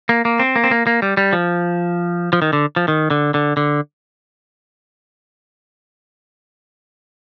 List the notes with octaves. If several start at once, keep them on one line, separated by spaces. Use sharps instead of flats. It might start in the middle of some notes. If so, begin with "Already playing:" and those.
A#3
A#3
C4
A#3
C4
A#3
A#3
G3
G3
F3
F3
D#3
D3
F3
D#3
D3
D3
D3